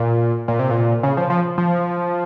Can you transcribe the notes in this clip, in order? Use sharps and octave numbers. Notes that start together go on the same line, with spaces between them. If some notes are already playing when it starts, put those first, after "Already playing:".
Already playing: A#2
A#2
C3
A#2
C#3
F3
F3
F3